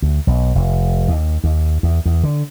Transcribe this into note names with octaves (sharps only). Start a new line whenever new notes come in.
D2
B1
F1
D#2
D#2
E2
E2
D3